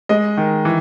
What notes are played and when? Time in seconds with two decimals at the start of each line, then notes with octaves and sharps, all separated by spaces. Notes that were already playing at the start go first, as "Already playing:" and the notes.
0.09 G#3 D#5
0.37 D#3
0.65 E3